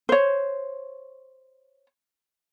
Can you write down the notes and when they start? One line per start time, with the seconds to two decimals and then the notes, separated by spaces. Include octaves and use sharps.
0.09 C5 C#5